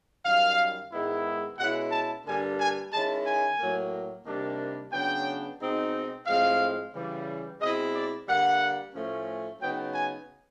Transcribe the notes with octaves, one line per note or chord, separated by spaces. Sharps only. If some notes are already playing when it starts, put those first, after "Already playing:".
F#2 D#3 G3 F5
G#2 D#3 G#3 B3 E4
B2 G#3 C#4 E4 F#5
A5
G2 D3 G3 A#3 D4 G#5
G#5
D#3 G#3 C#4 E4 A5
G#5
A2 F#3 A#3
C3 D#3 G3 A#3 D4
C#3 F#3 B3 D4 G5
B2 G#3 C4 D#4
A2 F3 G#3 C4 F5
C#3 E3 G3
B2 G#3 C4 E4 D#5
D5
D3 G3 A#3 F#5
A2 F3 A3 C#4
C#3 F#3 B3 D#4 G5
G#5